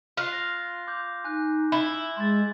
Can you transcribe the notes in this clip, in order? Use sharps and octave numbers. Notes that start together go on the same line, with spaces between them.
F4 F#6 C7
A#6
C6 D6 G6
D#4 G#5 F#6
E4 G7
G#3 C6 A6